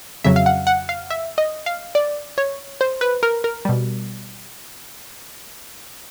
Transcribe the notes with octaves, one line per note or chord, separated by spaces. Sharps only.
F2 C#3 F#3 E5
F5
F#5
F#5
F5
E5
D#5
F5
D5
C#5
C5
B4
A#4
A#4
B2 G3